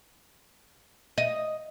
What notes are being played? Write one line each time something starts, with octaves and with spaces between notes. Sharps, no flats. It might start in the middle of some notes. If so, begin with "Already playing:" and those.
D#5